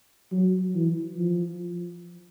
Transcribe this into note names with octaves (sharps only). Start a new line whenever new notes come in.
F#3
E3
F3